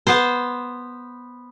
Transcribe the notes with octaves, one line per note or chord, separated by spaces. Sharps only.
B3 C5